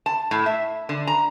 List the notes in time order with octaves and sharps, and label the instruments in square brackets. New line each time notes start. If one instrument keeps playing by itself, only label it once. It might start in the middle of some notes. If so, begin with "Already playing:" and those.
[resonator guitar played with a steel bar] A5
A2
E5
D3
A#5